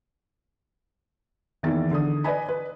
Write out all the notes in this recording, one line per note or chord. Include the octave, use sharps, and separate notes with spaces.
E2 D#3 E3 A#3 A6
D3 D#6
B4 D5 D#5 G#5 B5
B4